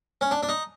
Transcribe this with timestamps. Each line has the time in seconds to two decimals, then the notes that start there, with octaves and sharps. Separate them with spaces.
0.21 C#4
0.31 D4
0.43 D4
0.49 D#4